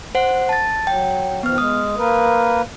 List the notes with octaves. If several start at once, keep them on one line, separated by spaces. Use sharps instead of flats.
C5 F#5
A5 A6
F#3 G5
D#3 F3 B3 F6
G#3 D#6
A#3 A#4 B4